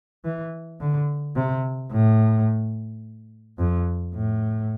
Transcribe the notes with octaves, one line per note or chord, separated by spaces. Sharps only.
E3
D3
C3
A2
F2
A2